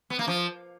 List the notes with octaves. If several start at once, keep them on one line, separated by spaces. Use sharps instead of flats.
B3
A#3
F3